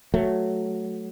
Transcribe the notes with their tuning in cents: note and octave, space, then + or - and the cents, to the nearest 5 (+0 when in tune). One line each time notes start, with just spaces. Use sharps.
F#3 +0 A3 +0